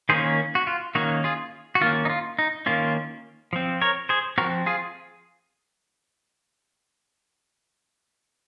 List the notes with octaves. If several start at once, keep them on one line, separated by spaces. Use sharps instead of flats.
D#3 A#3 C#4 G#4 C5
F#4
F4
D#3 A#3 C#4 D#4 F#4
F4 G#4
F#4
D#3 A#3 C#4 F4
D#4
F4
D#4
D#3 A#3 C#4 F4
F3 C4
A#4 C#5
G#4 C5
F3 C4 F#4 A#4
F4 G#4